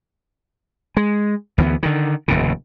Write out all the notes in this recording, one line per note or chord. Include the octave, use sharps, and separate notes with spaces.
G#3
D2 E3 F#3 B3
D3 D#3
F1 D#2 A2 C#3